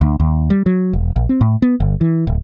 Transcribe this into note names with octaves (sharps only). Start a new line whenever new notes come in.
D2
D#2
G3
F#3
E1
A#1
C4
A2
B3
G1
E3
D1